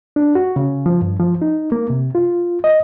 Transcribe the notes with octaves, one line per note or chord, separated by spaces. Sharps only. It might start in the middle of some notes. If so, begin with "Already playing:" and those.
D4
F#4
C#3
F3
G2
F3
D#4
A#3
C3
F4
D#5